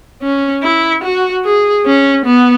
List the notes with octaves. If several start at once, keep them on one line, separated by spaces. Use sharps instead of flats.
C#4
E4
F#4
G#4
C#4
B3